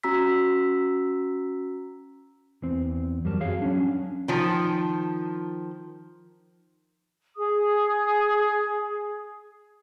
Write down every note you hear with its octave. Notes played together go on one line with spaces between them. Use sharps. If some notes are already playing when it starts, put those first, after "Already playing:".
C#4 F#4 A#5 E6 B6
E2 C4
F#2 G3 A#4 A5
F#4 G#4 C#5 F5
F#3 C#4 D4
D#3 F3
G#4 D#6